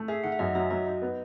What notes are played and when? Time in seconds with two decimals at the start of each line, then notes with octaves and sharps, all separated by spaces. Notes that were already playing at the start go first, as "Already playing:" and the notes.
Already playing: A3
0.08 G#4 E5
0.24 D#3 F#5
0.32 E5
0.39 F#2 D#5
0.55 F#3 E5
0.71 F#3 D#5
0.87 D#4
1.02 B3